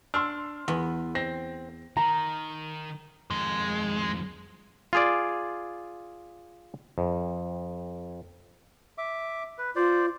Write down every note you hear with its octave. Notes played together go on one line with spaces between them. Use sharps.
D4 C6 E6 F6
E2 B3
C4 A#6
D#3 A#5
F2 D#3 G#3
F4 G#4 D5
F2
E5 D6
B4
F4 C5 D5